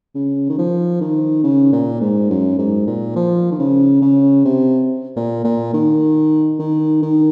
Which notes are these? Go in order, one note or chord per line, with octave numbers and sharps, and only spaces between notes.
C#3
D#3
F3
D#3
C#3
A#2
G#2
F#2
G#2
A#2
F3
D#3
C#3
C#3
C3
A#2
A#2
D#3
D#3
D#3